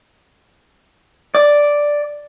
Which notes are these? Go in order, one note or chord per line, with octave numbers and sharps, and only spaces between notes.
D5